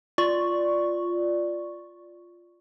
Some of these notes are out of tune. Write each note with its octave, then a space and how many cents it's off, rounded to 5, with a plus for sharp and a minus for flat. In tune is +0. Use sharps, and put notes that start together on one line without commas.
F4 +0 D5 +0 C#6 +0